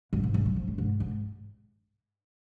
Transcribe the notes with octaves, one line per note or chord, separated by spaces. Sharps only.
F#2
G#2
C#3
F#3
F3
D3
G#2
G#2